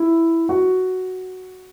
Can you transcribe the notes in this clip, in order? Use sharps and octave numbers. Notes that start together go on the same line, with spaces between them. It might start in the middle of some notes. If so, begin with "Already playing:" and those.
Already playing: E4
F#4